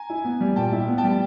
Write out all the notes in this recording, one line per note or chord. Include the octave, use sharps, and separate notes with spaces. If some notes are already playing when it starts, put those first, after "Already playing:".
Already playing: G#5 A#5
E4
B3
G3
A#2 G5 A5
E4
B3
G5 A5
G3